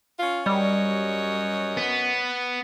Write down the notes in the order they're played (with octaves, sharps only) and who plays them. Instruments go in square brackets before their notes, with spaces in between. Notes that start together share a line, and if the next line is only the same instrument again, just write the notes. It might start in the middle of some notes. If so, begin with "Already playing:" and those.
[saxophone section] C#4 F4
[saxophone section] F#2 C#5 D#5 [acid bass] G3
[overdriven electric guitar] B3